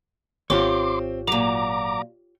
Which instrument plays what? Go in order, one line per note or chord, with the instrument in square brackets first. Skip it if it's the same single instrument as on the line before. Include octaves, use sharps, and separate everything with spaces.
[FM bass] G#1 [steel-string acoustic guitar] C4 [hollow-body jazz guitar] F4 G4 C#5 [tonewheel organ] C6 D6
[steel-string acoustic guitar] A#2 F#3 [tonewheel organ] A#5 D6